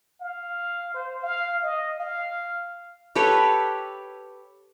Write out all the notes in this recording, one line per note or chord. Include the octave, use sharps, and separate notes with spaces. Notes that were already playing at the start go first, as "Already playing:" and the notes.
F5
C5
F5
D#5
F5
G4 A4 B4 C#5